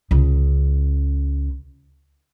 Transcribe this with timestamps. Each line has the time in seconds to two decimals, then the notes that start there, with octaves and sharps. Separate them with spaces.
0.11 C#2 C#3